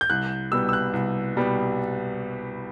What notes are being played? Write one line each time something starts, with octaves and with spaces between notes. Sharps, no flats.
G6
C2 F#6
B2 G3 B3 E6
E6
F#6
C2
B2 G3 B3